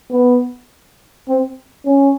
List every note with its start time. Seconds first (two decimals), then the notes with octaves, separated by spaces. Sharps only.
0.11 B3
1.28 C4
1.85 C#4